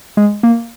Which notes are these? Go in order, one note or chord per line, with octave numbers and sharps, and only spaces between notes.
G#3
A#3